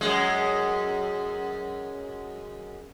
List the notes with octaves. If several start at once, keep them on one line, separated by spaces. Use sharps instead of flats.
F#2 G#3